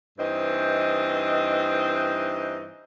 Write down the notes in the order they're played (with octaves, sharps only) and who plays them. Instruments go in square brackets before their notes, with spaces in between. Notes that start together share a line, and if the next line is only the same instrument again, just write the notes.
[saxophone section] G2 E3 C4 D#4 D#5